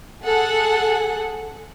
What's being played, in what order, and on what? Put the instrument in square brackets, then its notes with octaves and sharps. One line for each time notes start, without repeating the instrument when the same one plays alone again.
[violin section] G#4 A4 F#5